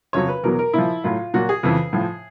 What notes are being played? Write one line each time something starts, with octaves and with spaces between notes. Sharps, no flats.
F2 C#3 F#3 C#5
B4
E2 B2 F#3 A#4
A#4
A#2 F3 E4
A2 F#3 F4
A#2 F#3 F#4
G#4
F2 C#3 E3
A2 F3